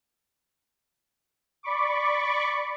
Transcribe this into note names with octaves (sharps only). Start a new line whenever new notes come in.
D5 B5 C#6 D6